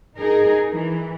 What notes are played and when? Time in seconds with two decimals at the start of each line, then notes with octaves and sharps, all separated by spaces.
0.18 D#4 G#4 A#4
0.70 E3